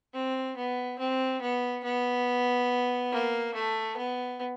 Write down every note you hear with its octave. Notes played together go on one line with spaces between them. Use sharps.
C4
B3
C4
B3
B3
A#3
A3
B3